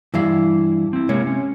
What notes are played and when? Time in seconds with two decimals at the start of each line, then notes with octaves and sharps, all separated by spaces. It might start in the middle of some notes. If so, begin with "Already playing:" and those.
0.14 G2 E3 E4 F5
0.93 C4 E4
1.09 C3 G#3 A#3 C#5
1.27 C#4